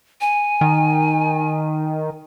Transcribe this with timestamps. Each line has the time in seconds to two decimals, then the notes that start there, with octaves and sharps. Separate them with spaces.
0.21 G#5
0.61 D#3